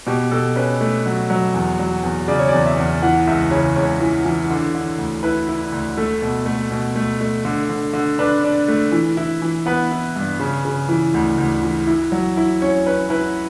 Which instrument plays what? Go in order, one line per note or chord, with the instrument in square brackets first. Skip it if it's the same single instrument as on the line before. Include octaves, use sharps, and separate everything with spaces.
[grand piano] B2 G4
B2 A4
C#4 B4
A3
F#3
F#3
E2
F#3
E2
C#3 D5
C#5
E2 D5
E5
E2
E3 F#5
C#2 E5
C#3 C#5
C#2 C#5
E3
E3
D3
D3
D2
E4 B4
E4
D2
A3 A4
B2
A3
B2
A3
A3
D3
D3
D3
D4 B4
D4
A3
E3
E4
E3
B3 B4
E4
G2
C#3
C#3
E3
D2
D2
E3
E4
F#3
E4
C#4 C#5
C#4 B4
E4 B4